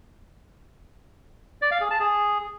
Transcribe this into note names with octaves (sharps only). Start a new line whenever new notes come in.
D5
F5
G#4
A5
G#4